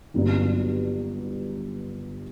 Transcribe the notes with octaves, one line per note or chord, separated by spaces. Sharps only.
G1 G2 F#3